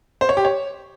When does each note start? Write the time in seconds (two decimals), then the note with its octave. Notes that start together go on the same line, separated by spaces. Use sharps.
0.21 C5
0.29 C#5
0.37 G4
0.45 C#5